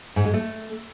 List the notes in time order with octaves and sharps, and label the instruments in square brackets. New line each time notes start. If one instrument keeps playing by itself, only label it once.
[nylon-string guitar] G#2
G#3
A3